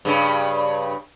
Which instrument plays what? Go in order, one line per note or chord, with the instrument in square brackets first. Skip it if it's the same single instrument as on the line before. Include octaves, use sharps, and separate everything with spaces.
[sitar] G2 C#3